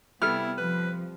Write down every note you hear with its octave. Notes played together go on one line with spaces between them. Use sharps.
C3 G3 B3 E4 A4 F6
F3 B4